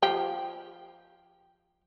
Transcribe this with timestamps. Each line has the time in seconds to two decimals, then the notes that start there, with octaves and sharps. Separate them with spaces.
0.02 F3 G4